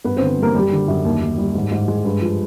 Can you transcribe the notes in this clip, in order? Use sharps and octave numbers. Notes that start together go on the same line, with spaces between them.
G2 B3 B4
D3 C4 C5
G3 A#3 A#4
F#2 G3 G4
D3
F#2
D#2
D#2
G3
G#2
G#2
G#3
G2
F3